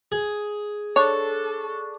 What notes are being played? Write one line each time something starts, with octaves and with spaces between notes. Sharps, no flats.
G#4
D4 A4 C#5 C#6